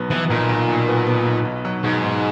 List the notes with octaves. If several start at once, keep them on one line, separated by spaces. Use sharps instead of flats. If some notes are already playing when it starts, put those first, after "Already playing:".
Already playing: B1 F#3 B3
E3 B3
B1 A#2
B1
B2
B3
B3
B1
B1
F#3
G#2 B2
B2